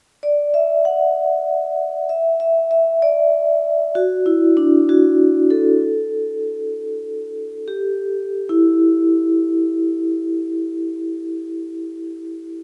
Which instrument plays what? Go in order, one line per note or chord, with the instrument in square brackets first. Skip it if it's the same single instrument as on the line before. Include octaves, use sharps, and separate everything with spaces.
[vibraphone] D5
E5
F#5
E5
E5
E5
D5
F#4
E4
D4
F#4
A4
G4
E4